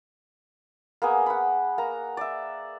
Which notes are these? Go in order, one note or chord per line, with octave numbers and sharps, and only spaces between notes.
A#3 B3 G#4
F#5 B5
A#3 A#5
D5 E5